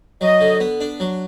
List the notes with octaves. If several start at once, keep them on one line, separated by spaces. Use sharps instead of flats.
F#3 D#5
D3
B3
D4
F#3